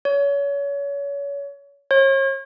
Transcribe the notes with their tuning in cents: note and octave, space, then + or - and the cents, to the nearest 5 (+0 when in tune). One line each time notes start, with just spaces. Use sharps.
C#5 +30
C#5 -40